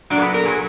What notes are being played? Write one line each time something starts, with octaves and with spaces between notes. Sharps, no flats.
A#2 F#3 D4
A#3
B3
A#4
A#2 F#3 G#4